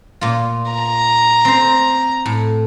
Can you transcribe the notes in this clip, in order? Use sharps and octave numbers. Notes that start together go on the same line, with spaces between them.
A#2 F4
A#5
C4 C5
A2